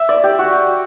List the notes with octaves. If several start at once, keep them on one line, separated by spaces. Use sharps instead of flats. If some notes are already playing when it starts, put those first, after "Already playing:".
Already playing: E5
D5
G4
F#4